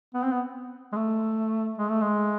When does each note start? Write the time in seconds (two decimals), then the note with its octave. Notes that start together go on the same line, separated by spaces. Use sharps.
0.14 B3
0.23 C4
0.32 B3
0.92 G#3
0.96 A3
1.78 G#3
1.90 A3
2.01 G#3